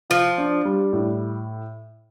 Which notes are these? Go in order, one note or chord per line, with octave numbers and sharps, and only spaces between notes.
F3 F4
D4
G3
A2